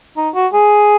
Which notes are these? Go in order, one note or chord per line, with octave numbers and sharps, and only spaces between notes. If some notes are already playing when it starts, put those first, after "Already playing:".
D#4
F#4
G#4